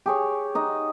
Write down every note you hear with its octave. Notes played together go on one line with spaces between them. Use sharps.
G4 G#4 C#5
D#4 D#5 F#5